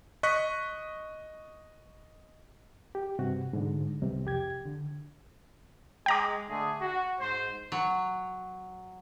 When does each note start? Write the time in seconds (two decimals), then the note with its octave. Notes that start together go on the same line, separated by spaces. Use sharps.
0.23 D#5 C#6 F#6 B6
2.95 G4
3.19 G2 C3 F#4
3.53 G#2 D3
4.02 C2 C3
4.25 F2 G4 G#6
4.65 D3
6.06 G#3 G5 A#5 D6
6.48 D3 A3 G#4
6.80 F#4
7.19 G#2 C5
7.72 F#3